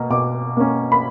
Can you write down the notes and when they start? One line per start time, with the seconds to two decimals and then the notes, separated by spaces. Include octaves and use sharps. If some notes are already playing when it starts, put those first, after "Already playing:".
Already playing: B2 A#3
0.10 B2 D6
0.57 A#3 C#4
0.92 B5